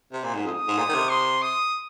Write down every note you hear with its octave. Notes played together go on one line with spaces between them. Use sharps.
C3
A#2
G#2
F2 D#6
G#2
A#2
D#3
C3
C6
D#6